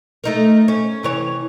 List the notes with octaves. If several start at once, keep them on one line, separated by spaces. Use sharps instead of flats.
A3 D#4 A#4
C#4
C3 E3 C#5